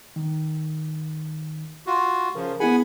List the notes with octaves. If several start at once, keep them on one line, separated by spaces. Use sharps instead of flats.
D#3
F4 F#4
C#3 F3 A#4
B3 E4 G#4 F#5 G#5 B5